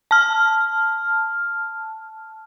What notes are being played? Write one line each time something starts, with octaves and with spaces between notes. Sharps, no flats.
A5 F6